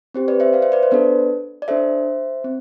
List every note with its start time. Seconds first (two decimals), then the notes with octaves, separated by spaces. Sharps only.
0.14 C4 G4 C5
0.28 B4 D5
0.40 C5 E5
0.53 D5 F5
0.62 C5 E5
0.72 B4 D5
0.83 C5
0.91 B3 D4 A4 B4 D5
1.62 D5
1.68 D4 A4 C5 E5
2.44 C4